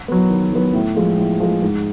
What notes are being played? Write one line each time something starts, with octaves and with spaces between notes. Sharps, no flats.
F#3 B3
D#3
F#3 B3
A2
F3 G#3
A2
F3 G#3
G#2